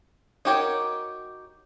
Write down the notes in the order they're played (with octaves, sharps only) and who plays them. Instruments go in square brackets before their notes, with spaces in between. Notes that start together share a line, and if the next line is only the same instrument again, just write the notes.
[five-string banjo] D#4 F#4 G4 A#4 C#5